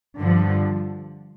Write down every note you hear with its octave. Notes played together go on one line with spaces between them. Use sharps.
G2 D3 F3